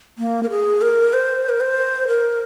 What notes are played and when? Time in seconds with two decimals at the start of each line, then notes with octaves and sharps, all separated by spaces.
0.18 A#3
0.43 A#4
0.50 G#4
0.81 A#4
1.13 C5
1.49 A#4
1.60 C5
2.08 A#4